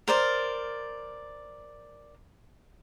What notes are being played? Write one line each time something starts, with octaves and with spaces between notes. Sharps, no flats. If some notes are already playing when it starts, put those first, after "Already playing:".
A#4 C5 D5